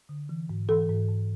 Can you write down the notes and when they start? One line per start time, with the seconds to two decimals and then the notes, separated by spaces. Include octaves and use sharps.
0.09 D3
0.29 E3
0.50 G#2
0.69 E3 A4
0.89 G#2
1.09 G#2